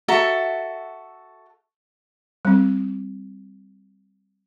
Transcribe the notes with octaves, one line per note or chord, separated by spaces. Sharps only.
F#4 A4 E5 A#5
G3 C4